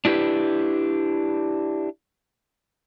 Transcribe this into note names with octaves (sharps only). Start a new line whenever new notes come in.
D4 E4 G4 B4